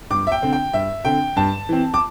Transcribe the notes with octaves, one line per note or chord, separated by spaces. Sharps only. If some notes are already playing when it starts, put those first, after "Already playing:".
G2 D6
E5
G5
D3 C4
G5
G2 E5
D3 C4 G5
G2 A5
E3 C4
D6